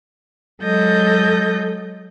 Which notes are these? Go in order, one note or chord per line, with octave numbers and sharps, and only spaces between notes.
F#3 G#3 A4 D#5 G6 A#6